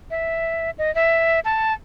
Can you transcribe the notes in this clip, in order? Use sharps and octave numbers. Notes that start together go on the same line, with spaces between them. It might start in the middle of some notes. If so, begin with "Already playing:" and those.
E5
D#5
E5
A5